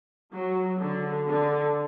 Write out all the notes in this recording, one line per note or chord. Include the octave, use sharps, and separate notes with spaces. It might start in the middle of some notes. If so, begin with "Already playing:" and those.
F#3
D3
D3